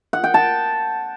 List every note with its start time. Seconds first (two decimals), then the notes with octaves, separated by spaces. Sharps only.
0.13 F#5
0.24 G5
0.34 A5